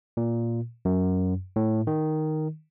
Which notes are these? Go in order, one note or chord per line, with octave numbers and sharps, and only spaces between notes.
A#2
F#2
A2
D#3